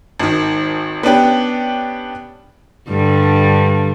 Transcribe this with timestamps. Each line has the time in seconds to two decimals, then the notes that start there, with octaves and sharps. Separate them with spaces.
0.20 G#1 D#3
1.03 B3 C#4 D4 G4
2.89 G2 D3 G3